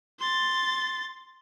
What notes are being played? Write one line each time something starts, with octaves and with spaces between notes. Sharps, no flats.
C6 A6